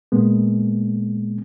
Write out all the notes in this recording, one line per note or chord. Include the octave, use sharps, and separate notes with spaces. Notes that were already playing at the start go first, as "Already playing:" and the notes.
A#2 G#3 A#3 B3